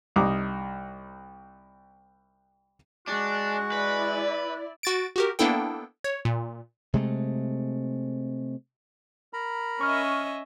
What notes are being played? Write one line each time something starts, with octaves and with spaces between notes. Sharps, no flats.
C2 D#4 D6
G#3 D4 F#4
E4 B4 D5
F#4 A6 D7
F#4 G4 A#4
A#3 B3 D4 E4 A4 G5
C#5
A#2
C3 G#3 A3
A#4 A#5 B5
C#4 D#5 E5 C#6 F6